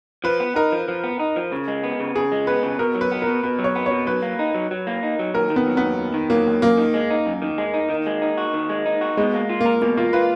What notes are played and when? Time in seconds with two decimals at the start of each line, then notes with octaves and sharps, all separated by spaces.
0.24 F3 B4
0.40 B3
0.56 D#4 A#4
0.72 F3
0.88 F3
1.04 B3
1.20 D#4
1.36 F3
1.52 C#3
1.68 G#3
1.83 B3
2.00 C#3
2.15 C#3 G#4
2.32 G#3
2.47 B3 B4
2.63 C#3
2.79 B2 A#4
2.95 F#3
3.01 B4
3.11 B3
3.22 A#4
3.27 B2
3.43 B2 B4
3.59 F#3
3.64 C#5
3.75 B3
3.86 C#5
3.91 B2
4.06 F#3 B4
4.22 A#3
4.39 D#4
4.55 F#3
4.71 F#3
4.87 A#3
5.03 D#4
5.19 F#3
5.34 D#2 A#4
5.50 D#3
5.56 B3
5.66 F#3
5.77 D#2 B3
5.98 D#2
6.14 D#3
6.30 F#3 A#3
6.47 D#2
6.62 F#2 A#3
6.78 D#3
6.94 G#3
7.11 D#4
7.26 F#2
7.42 D#3
7.58 G#3
7.74 D#4
7.90 D#3
8.06 G#3
8.22 D#4
8.38 F#4
8.53 D#3
8.69 G#3
8.86 D#4
9.01 F#4
9.17 B2 G#3
9.34 A#3
9.49 F4
9.61 A#3
9.66 A#4
9.82 B2 A#3
9.97 A#3 F4
10.13 F4 B4